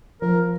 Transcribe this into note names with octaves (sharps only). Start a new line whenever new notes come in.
F3 A#4